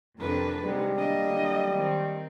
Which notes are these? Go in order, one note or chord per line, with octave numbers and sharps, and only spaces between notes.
F2 C3 D4 A#4 B4
C3 G3 G#3 B3 D#4
A#3 D4 D#5
D3 F#3
D#3 C4